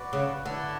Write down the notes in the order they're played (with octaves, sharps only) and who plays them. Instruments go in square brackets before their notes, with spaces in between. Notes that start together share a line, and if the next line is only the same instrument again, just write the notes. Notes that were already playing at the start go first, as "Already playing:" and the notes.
Already playing: [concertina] F#4 B4 D5
[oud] C#3
[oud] D3 [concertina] E4 B4 D5 F#5